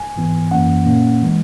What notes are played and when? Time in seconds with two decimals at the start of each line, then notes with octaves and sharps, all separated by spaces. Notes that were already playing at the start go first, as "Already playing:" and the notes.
Already playing: G#5
0.16 G#2 E3 B3
0.51 F#2 E3 A#3 C#4 F#5
0.86 A#2 A#3 C#4
1.22 E3 G#3